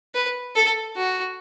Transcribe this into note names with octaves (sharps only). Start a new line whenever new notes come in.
B4
A4
F#4